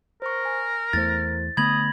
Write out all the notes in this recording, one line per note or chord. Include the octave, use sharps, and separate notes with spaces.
A#4 C5 C#6
G#5
E2 A3 E4 C5 A6
D3 A3 B3 B5 D#6 G#6 A#6 F#7